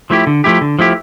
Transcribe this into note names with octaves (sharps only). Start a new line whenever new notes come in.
F3 A3 E4 G4
D3
F3 A3 E4 G4
D3
F3 A3 E4 G4